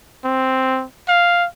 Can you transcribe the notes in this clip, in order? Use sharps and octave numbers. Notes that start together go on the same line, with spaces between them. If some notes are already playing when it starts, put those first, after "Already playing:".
C4
F5